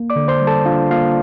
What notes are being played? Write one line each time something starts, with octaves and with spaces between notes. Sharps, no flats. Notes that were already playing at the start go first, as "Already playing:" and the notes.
Already playing: A#3
D5 D6
D3
C5 C6
G3
A4 A5
D4 F4 F5
A#3 F4 F5